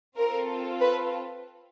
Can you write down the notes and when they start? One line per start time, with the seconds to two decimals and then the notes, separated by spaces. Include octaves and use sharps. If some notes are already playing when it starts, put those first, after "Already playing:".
0.17 C4 F4 A4 A#4
0.80 B4